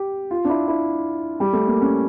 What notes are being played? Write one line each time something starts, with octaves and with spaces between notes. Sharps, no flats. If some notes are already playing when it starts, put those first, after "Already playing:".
Already playing: G4
F4
D4
E4
E4
G3
A3
A#3
C#4